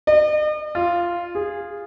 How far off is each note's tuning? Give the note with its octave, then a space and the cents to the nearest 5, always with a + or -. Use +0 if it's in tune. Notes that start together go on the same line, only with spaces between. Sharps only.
D#5 -45
F4 -5
G#4 -15